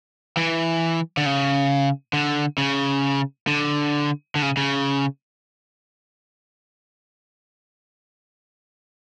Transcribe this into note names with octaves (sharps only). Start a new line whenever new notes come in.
E3
D3
C#3
D3
C#3
D3
D3
C#3
C#3